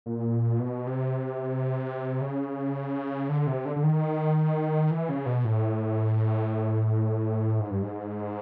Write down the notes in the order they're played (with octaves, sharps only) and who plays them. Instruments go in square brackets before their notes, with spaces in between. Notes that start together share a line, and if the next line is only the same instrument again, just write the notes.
[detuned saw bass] A#2
B2
C3
C#3
D3
C3
D3
D3
D#3
E3
C#3
B2
A2
G#2
G2
G#2